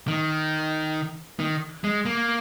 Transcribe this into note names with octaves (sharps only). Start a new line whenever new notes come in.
D#3
D#3
G#3
A#3